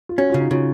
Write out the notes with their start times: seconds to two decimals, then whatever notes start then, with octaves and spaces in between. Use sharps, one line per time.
0.09 F4
0.18 C#4 F#4
0.30 C#3 F4
0.40 D#4
0.51 C#3 F4